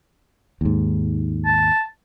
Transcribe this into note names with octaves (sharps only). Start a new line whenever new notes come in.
D#2 G#2
A5